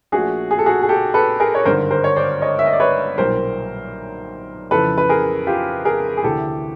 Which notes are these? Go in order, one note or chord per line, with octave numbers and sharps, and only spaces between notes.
A#1 A#2 F3 A3 F#4 G#4
G#4
A4
F#4 G#4
G#4
G4 A4
A4 B4
G#4 A#4
C#5
G#1 G2 D3 A#4 C5
A#4 C5
C#5
C5 D5
C#5 D#5
E5
D#5
D5
B4 C#5
B1 A#2 G3 A#4 C5
F2 C#3 E3 A4 B4
B4
G#4 A#4
F4 G4
G#4 A#4
G#4
D2 C3 E3 G4 A4